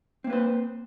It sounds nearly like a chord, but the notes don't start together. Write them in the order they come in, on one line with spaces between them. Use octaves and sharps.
C4 A#3 B4 C5